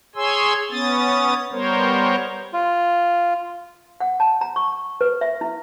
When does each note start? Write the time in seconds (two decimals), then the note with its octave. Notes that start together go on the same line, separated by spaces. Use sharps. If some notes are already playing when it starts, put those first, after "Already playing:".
0.16 G#4 C#5 G#5 C6 E6
0.71 B3 C#4 D#6 A6
1.52 G3 B3 A#4 C5 C#5
2.53 F4
4.00 F#5
4.20 A5
4.41 A#5
4.56 C#6
5.01 B4
5.21 E5
5.41 E4